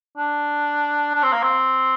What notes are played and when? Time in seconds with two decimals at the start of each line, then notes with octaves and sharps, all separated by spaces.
0.18 D4
1.14 D4
1.23 C4
1.33 A#3
1.43 C4